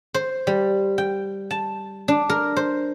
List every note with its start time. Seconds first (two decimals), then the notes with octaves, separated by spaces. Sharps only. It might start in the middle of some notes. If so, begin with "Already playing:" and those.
0.14 C5
0.47 G3
0.98 G5
1.51 A5
2.08 D4
2.29 A#4
2.57 C5